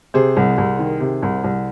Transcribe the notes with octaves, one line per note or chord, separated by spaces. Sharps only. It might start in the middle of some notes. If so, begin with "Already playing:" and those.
C3 G#4 C5
C2
C2
D#3
C3
C2
C2